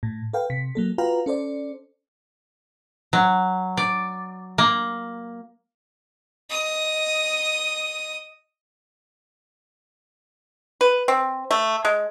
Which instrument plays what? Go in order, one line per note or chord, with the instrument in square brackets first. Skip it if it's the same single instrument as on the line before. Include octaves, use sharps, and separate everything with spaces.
[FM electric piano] A2
A4 B4 F5 G5
C3 B6
F#3 A#3 A4
F4 F#4 B4 F5 G5 A#5
C#4 A4 C5 D5
[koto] F#3
D5
A#3
[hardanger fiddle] D#5 D#6
[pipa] B4
C4
A3
G#3